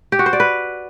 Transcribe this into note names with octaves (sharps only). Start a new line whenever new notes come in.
G4
F#4
C5
D5
B4